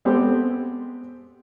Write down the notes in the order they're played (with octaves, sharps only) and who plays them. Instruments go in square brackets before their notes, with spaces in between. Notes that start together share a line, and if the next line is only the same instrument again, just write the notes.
[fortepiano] G#3 B3 C4 G4 A4